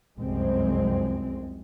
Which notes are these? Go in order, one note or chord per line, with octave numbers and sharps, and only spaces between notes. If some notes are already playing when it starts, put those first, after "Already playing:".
F1 C2 F#2 G#3 C4